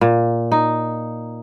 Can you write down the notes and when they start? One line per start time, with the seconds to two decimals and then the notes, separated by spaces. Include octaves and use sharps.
0.01 A#2
0.52 D#4